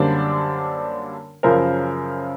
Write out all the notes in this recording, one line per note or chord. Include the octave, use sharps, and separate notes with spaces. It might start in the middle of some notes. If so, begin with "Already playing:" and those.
Already playing: F#2 D3 G3 A#3 D4 C5 D5
F#2 C#3 F3 A#4 C5